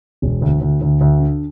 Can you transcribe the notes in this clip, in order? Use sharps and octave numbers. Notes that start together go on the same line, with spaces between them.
E1
D2
D2
D2
D2
D3